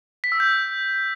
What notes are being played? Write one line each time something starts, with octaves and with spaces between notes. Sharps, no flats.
B6
E6
G6